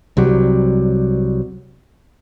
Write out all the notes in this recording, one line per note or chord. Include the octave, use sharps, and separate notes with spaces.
C2 C3 F#3 G3